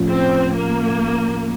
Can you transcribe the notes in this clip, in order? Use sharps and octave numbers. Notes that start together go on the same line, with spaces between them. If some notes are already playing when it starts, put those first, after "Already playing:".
Already playing: A2 F3 A3 C#4 F4
C4
A#3